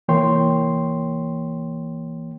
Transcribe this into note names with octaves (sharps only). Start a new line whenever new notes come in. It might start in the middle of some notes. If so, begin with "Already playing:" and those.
C2 E3 A#3 C#5 G5 C6